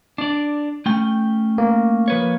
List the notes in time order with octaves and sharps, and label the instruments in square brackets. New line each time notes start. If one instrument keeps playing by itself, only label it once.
[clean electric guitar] D4 D5
A3 C#4 G5
[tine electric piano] A#3
[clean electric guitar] F3 B4 C#5